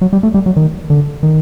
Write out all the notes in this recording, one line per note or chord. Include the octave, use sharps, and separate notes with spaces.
F#3
G3
A3
G3
F#3
D#3
D3
D#3